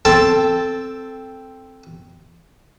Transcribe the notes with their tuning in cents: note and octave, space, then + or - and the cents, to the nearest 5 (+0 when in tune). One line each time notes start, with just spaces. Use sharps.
C4 +0 A4 +0 A5 +0